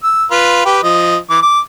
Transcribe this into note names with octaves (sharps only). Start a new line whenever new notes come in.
E6
F4 B4
G4 B4 G5
F3 D#5
E3 D6
D6